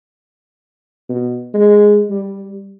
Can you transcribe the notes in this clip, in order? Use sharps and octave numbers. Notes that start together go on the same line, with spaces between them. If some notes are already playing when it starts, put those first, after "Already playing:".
B2
G#3
G3